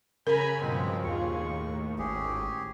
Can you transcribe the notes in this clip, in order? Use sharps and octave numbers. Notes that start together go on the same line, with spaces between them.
C#3 A#4 G#5 A#5 B5
G2 B2 F3 G#3 C4
D#2 F4 G#4 C#6
A2
G#1 C#4 G4 G#4